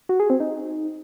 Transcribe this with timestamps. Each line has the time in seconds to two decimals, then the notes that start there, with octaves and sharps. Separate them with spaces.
0.09 F#4
0.20 G#4
0.30 C4
0.40 D#4